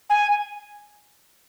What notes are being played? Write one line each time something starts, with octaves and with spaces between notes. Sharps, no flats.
G#5